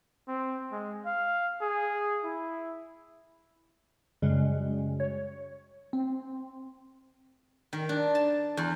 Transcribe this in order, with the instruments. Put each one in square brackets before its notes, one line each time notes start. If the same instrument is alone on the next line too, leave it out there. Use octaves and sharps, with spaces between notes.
[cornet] C4
G#3
F5
G#4
E4
[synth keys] F#2 C#3 G3 G#3
C#5
C4
[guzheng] D#3
D4
A5
E2